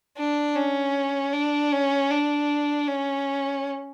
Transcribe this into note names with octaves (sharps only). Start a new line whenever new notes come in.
D4
C#4
D4
C#4
D4
C#4